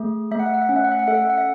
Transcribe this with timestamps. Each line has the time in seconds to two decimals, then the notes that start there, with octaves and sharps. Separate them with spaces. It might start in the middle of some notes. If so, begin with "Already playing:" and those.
Already playing: A3 G#4
0.31 A3 E5
0.39 F#5
0.46 E5
0.54 F#5
0.62 E5
0.69 C#4 F#5
0.76 E5
0.84 F#5
0.92 E5
0.99 F#5
1.07 A4 E5
1.14 F#5
1.22 E5
1.30 F#5
1.38 E5